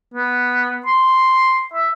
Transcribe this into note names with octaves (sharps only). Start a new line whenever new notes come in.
B3
C6
E5